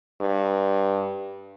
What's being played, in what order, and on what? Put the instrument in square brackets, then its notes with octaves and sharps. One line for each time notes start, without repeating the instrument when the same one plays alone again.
[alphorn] G2